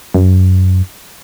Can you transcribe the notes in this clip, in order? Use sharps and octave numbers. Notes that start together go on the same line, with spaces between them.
F#2